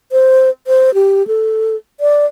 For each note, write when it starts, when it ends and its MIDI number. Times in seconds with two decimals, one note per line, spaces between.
0.12 0.50 72
0.67 0.93 72
0.94 1.26 67
1.27 1.76 69
2.00 2.26 74